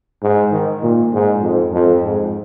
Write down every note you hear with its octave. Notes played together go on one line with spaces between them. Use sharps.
G#2
D#3
A#2
G#2
F2
F2
G#2